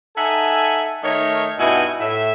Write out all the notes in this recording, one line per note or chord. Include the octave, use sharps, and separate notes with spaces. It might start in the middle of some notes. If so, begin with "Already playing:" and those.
D#4 A4 E5 F#5 G#5
D#3 A3 D#4 A#4 C#5
G2 B2 D#4 E4 F#4 G#5
A2 E5